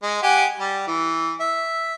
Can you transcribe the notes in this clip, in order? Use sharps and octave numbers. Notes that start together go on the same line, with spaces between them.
G#3
G4 F#5 G#5
G3
E3
E5